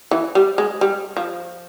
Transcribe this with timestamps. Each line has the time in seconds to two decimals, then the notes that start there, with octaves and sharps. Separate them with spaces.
0.11 E3
0.35 G3
0.58 G#3
0.81 G3
1.17 F3